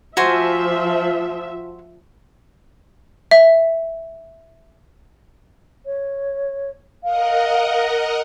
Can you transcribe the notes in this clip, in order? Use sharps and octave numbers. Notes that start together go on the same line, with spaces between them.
F3 F#4 C5 E5 G#5
E5
C#5
A#4 D#5 F5 F#5